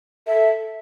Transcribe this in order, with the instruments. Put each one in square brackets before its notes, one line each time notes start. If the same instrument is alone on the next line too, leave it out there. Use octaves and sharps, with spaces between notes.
[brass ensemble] A4 [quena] E5